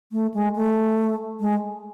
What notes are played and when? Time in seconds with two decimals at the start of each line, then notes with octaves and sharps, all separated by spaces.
0.12 A3
0.34 G#3
0.55 A3
1.40 G#3